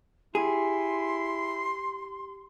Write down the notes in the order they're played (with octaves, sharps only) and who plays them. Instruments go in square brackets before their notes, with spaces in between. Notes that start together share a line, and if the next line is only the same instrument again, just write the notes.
[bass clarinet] E4 [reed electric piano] G4 [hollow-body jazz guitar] G#4 [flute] C6